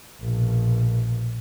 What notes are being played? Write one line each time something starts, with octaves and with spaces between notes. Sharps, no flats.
A#1 B2